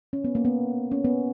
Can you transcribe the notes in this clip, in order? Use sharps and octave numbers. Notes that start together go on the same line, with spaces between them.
C#4
B3
A#3
B3
C#4
B3